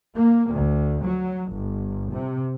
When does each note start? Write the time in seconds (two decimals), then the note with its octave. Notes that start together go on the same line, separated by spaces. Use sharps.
0.15 A#3
0.53 D2
1.04 F#3
1.52 G1
2.12 C3